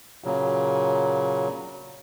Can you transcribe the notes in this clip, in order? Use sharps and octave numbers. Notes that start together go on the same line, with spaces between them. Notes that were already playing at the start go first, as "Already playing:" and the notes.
A#2 C#3 F#3